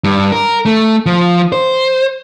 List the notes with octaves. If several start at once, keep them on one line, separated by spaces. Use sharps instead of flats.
G2
A#4
A3
F3
C5